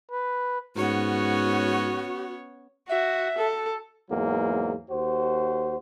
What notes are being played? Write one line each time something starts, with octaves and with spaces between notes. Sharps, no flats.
B4
G#2 B3 C#4 F#4 C#5
F#4 E5
A4
E2 G#2 F#3 A#3
D#2 F#4 C5